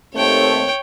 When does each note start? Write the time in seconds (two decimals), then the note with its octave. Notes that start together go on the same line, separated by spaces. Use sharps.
0.15 D#2 A3 C4 C#5 G5